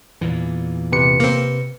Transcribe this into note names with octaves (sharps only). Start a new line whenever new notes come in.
E2 A#2 E3
C3 B4 C#7
A#3 C4